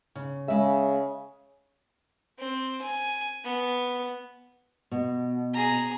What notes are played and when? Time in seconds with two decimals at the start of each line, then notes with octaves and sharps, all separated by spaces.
0.15 C#3
0.48 C#3 G#3 E5
2.39 C4
2.82 G#5
3.44 B3
4.91 B2
5.54 G#4 A#5